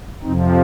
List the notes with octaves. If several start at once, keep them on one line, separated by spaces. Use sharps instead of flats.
F2 C3 F3 C4 D#4